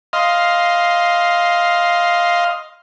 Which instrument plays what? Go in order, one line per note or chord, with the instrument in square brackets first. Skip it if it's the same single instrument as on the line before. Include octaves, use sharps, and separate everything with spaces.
[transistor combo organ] D#5 F5 C6